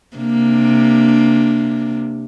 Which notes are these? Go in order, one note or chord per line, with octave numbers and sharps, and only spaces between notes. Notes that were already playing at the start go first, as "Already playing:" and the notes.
C3 A#3 D4